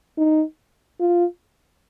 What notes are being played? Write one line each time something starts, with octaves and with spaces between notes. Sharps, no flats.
D#4
F4